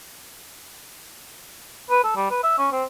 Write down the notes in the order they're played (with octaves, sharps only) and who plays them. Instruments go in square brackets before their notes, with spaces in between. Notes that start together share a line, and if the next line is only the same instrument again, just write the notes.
[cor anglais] B4
A4
G3
B4
E5
C#4
C4